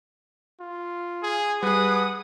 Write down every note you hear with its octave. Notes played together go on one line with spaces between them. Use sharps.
F4
G#4
G3 G#4 B4 F#5 D#6